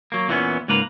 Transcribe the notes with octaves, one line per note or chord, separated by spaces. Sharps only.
F#3 A#3
E2 A#2 E3 G#3 B3 C#4
C#2 G#2 A#3 B4 A#5